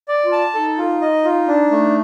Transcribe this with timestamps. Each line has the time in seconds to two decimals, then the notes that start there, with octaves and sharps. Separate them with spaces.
0.08 D5
0.24 F4
0.32 A5
0.54 D#4 A4
0.78 F4
1.01 D#5
1.25 F4
1.48 D4
1.71 A3